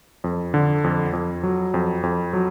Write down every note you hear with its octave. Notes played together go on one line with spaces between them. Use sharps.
F2
D3
F2
F2
F#3
F2
F2
F#3